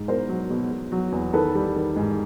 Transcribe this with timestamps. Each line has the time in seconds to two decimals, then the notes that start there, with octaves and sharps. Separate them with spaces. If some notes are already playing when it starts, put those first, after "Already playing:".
Already playing: G#2
0.08 B2 A#4 C5
0.29 F#3
0.50 B2
0.71 B2
0.92 F#3
1.12 E2
1.33 D#3 A4 B4
1.55 G3
1.76 D#3
1.96 G#2